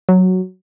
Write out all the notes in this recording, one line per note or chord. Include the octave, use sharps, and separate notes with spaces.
F#3